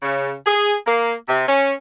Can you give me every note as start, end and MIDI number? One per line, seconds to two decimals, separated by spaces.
0.02 0.33 49
0.46 0.74 68
0.86 1.12 58
1.28 1.46 48
1.49 1.72 61